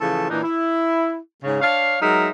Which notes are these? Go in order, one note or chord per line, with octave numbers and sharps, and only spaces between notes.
C#3 E3 F3 A3 A4
A#2 E3 D4 D#4
E4
G#2 C#3
D4 C#5 F5
F#3 G#3 D#4 A#4 E5